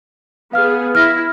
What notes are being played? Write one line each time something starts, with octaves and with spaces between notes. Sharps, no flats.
B3 G#4 F5 F6
E4 F6 A#6